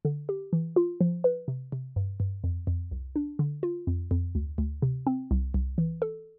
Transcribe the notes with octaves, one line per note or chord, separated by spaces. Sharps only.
D3
G4
E3
F4
F3
B4
C3
C3
G2
G2
F2
F2
C2
D4
D3
F4
F2
F2
D2
D2
C3
C4
C2
C2
E3
A4